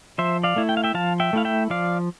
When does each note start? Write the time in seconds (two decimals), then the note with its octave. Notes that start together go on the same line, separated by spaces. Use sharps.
0.18 F3 C5 E5
0.43 D5 F5
0.56 A3 E4
0.69 G5
0.77 F5
0.84 E5 G5
0.94 F3 F5 A5
1.20 E5 G5
1.33 A3 E4 F5
1.45 E5 G5
1.70 F3 D5 F5